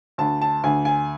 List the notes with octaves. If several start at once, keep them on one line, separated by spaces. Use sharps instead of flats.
D2 A5
A5
D2 G#5
G#5